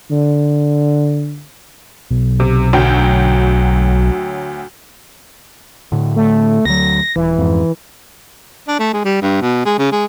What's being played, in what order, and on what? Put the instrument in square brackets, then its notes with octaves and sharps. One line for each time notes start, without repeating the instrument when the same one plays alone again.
[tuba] D3
[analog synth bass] B1
[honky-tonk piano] C3
D2 F#3 G5
[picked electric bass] A2 D3
[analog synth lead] A3
[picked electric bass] D2 F#3 [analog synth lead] A#6
[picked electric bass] D#1 [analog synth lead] E3
[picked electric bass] F2 G#2
[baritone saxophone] D4
A3
G#3
G3
G2
B2
G#3
C#3
G#3